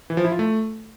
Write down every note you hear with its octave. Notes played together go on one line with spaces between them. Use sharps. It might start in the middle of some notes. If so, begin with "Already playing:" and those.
E3
F3
E4
F4
A3